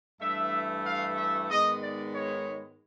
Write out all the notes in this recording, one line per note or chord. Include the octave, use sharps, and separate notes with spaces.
G2 E3 A3 E5
F5
E5
G#2 D#3 G#3 B3 D#5
D5
C#5